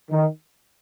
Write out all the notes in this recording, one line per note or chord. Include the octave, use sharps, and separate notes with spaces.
D#3